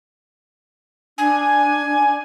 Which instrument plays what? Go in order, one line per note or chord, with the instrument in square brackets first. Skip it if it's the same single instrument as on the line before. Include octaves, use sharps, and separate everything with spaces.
[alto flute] D4 [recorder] G#5